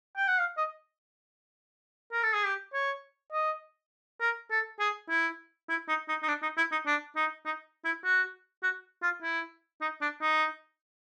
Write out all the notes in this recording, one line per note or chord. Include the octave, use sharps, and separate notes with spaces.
G5
F#5
F5
D#5
A#4
A4
G#4
G4
C#5
D#5
A#4
A4
G#4
E4
E4
D#4
D#4
D#4
D4
D#4
E4
D#4
D4
D#4
D#4
E4
F#4
F#4
F4
E4
D#4
D4
D#4